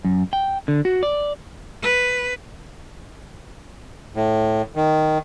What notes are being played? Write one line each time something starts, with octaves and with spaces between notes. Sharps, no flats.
F#2
G5
D3
F#4
D5
B4
A2
D#3